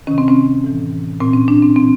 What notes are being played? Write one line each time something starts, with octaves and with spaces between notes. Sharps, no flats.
C3 D#3 C#4
C4
C#4
A2 E3
A#2 C4
C#4
D4
C4
A2 E3 C4